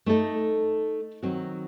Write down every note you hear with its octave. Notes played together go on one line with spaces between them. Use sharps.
A3 D#4 A4 D#5
D#3 F#3 C4 F#4